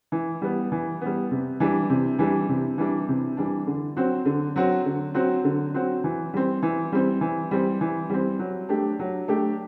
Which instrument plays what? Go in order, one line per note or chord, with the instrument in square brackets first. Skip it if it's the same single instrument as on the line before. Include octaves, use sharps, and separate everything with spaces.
[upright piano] E3
G3 B3
E3
G3 B3
C3
E3 G3 D4
C3
E3 G3 D4
C3
E3 G3 D4
C3
E3 G3 D4
D3
F#3 C4 F#4
D3
F#3 C4 F#4
D3
F#3 C4 F#4
D3
F#3 C4 F#4
E3
G3 C4
E3
G3 C4
E3
G3 C4
E3
G3 C4
F#3
A3 D4 G4
F#3
A3 D4 G4